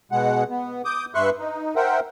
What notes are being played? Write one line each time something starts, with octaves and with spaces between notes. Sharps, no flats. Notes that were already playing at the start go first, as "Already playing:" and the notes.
B2 G#3 F#5
B3
D6 D#6 G6
G2 B4 E5 C6 C#6 F#6
D#4
A#4 C5 E5 F#5 G5